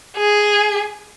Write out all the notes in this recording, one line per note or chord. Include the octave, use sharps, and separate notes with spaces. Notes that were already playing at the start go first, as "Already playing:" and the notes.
G#4